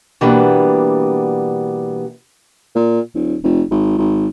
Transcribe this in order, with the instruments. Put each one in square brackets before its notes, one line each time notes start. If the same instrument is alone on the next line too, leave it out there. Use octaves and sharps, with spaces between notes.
[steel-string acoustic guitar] B2 E3 G3 A#3 B3 D4
[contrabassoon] A#2
D#1
F1
G#1
G#1